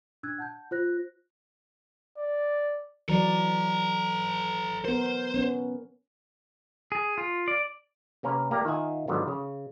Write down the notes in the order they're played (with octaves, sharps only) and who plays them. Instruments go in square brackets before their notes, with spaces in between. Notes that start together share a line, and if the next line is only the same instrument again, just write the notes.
[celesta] D4 E6 F#6 G#6
F#5 A5 G6
F4 C5 F#6 A#6
[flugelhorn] D5
[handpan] E3 F#3 D5 [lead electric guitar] A4 A#5
[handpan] B3 A#4 [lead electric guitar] C5
[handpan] B3 C#4
[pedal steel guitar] G#4
F4
D5
[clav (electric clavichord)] C3 A#3 C#4 A#4 B4
A#3 G4 A#4 D5 A#5
D#3 F4 E5 F#5 G#5
G#2 D3 D#3 F#3 B3 F4
C#3